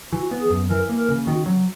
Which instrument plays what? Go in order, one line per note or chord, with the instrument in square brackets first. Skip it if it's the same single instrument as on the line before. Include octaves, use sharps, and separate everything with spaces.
[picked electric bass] E3 [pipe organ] F#4
[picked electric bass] B3
[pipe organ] G#4
[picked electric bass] F#2
[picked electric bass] E3 [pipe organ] A#4
[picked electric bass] A#3
[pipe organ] A#4
[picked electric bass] C#3
[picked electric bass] D#3 [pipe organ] F#4
[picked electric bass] F#3